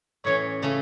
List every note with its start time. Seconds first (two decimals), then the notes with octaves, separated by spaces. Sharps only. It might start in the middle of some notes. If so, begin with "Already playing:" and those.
0.25 A2 E3 C#4 C#5
0.62 C#3 A3 C#4